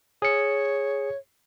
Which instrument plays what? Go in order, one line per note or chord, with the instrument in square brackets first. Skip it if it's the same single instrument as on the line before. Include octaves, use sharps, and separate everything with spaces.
[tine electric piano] G#4 C#7 [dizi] C#5